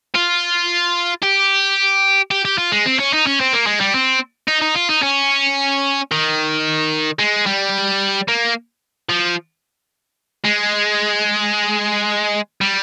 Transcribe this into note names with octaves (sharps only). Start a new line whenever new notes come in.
F4
G4
G4
G4
F4
G#3
C4
C#4
D#4
C#4
C4
A#3
G#3
G3
C4
D#4
D#4
F4
D#4
C#4
D#3
G#3
G3
A#3
F3
G#3
G3